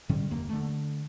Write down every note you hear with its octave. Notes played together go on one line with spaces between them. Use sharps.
G#2 D3 G3 C#4
F#1 D#2 A#3
D3 A3